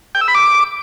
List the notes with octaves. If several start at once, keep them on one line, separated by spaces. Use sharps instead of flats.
G5
E6
B5
D6